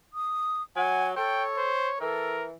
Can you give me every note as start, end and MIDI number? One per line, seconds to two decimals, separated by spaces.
0.14 0.62 87
0.76 1.16 54
0.76 1.15 78
0.76 1.08 80
1.17 1.71 69
1.17 1.97 73
1.17 1.44 79
1.57 1.91 72
2.01 2.53 52
2.01 2.38 69
2.01 2.47 70